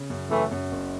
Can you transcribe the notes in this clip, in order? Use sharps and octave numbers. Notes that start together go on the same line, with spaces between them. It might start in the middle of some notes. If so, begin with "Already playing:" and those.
Already playing: C#3
F#2
F#2 E3 A3
F#2
F#1